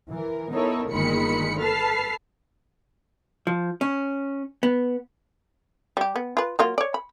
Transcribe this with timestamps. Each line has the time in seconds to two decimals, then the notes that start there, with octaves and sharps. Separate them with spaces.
0.11 E3 A#4
0.53 B3 D#4 E4 A4 A#4 C#5
0.90 G1 A#2 D#3 G#3 B5 C#7
1.59 A4 B4 A5 F6 C7
3.47 F3
3.81 C#4
4.63 B3
5.97 G3 G4
6.16 B3
6.37 F4 B4
6.59 F#3 A#3 F4
6.78 C#5 D5
6.94 B5